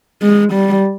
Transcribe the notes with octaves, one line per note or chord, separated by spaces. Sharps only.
G#3
G3